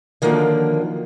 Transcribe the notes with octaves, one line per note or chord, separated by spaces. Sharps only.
D3 D#3 F3 F#3 A#3